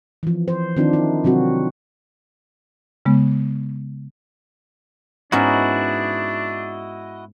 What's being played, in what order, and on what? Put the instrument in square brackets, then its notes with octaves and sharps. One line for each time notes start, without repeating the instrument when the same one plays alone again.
[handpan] E3 F3
C5
D#3 C4 D4 D#4 F4
D#4 E4
C3 F#3 C4 F#4
[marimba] C#3 G#3 B3
[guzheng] G#2 B3 C#4 [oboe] D4 [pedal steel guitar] E4 F#4 D#5